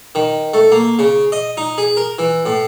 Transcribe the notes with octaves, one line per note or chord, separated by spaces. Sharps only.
D#3
A3
A#3
C#3
D#5
D#4
G#4
A#4
E3
A2